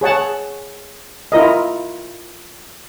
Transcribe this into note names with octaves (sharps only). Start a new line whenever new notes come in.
G#4 C#5 F#5 A5
E4 F4 A#4 D#5